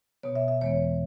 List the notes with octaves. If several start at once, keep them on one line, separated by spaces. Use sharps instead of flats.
B2 B3 C#5
E5
E5
E2 E3 G#3 B3 C#5